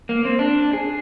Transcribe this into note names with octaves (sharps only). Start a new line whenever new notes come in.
A#3
C4
D4
G#4